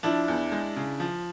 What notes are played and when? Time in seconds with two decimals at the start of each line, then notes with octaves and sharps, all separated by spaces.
0.03 F3 D4 E4
0.28 E2
0.52 G#3
0.76 C#3
1.00 F3